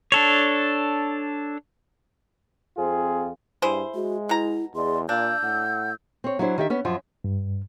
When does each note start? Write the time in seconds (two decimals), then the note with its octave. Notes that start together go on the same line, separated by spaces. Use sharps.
0.12 D4 A4 C#5
2.77 F2 C4 F4 G#4
3.62 G2 E4 G#4 C5
3.95 G#3 F#4
4.29 B2 E4 A#5
4.75 E2 G#4 D5 D#5 C6
5.09 A#2 D4 F5 E6 G6
5.43 A2 F#5
6.24 C4 C#5
6.39 F#3 D4 E4 C5
6.58 D#3 G4 E5
6.70 B3 C#4
6.85 F#2 F3
7.24 G2